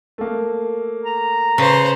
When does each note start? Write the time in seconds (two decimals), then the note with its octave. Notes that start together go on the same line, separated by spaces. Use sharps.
0.18 A3 A#3
1.04 A#5
1.58 C#3 B4 C5